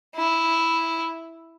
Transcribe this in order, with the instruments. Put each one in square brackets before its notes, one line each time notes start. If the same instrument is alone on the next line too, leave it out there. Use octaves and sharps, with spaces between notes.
[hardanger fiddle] E4